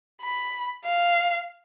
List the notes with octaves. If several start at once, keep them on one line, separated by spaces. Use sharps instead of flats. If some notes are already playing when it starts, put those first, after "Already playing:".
B5
F5